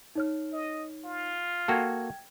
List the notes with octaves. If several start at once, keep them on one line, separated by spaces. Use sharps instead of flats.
D#4 C#5 F6
D#5
F4
A#3 F#4 A4 G5 F6 G#6